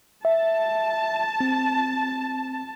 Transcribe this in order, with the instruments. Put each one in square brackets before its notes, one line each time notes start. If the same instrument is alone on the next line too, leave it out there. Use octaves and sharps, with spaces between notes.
[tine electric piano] E5 [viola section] A5
[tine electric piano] C4